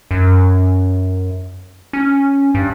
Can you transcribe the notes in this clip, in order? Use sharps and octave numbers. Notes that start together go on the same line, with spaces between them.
F#2
C#4
G2